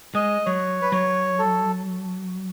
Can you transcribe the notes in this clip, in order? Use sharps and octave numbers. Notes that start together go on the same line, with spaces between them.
G#3 D#5
F#3 C#5
B4
F#3 C#5
A4